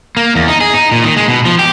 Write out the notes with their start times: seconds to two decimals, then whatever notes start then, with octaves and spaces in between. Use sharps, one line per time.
0.17 A#3
0.35 E2
0.48 D#4
0.61 G#4
0.74 D#4
0.92 A#2
1.04 D#3
1.17 G#3
1.28 B2
1.45 F3
1.59 G4